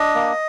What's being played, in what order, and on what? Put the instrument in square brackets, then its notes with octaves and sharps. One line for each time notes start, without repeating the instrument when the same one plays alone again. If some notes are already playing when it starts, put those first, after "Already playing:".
Already playing: [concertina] D4 D#5
A#3